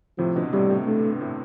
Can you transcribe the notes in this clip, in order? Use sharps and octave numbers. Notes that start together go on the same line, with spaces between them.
A2 C3 F3
B2 D3
A2 C3 G3
A2
G2 A3
G2
A2